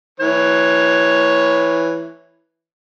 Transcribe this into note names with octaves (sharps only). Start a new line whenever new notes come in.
E3 C#5